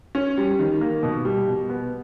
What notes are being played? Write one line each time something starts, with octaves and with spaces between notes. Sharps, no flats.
C#4
G3
D#3
A#3
B2
G3
B2
B3